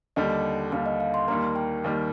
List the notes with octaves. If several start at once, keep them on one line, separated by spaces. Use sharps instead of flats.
D#2 D3 G3 D#5
D#2 D3 G3 F5
D#5
F5
C6
D#2 D#3 G3 A#3 A#5
G5
D#2 D#3 G3 A#3